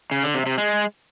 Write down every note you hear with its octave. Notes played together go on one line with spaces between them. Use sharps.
C#3
D3
C3
C3
G#3